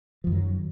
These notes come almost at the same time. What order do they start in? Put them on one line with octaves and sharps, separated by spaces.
F3 F#2 D#3 F#3